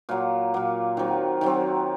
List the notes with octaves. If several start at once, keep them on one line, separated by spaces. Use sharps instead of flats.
A#2 F#3 A#3 F4
A#2 F#3 A#3
D#3 F#3 C4
D#3 F#3 C4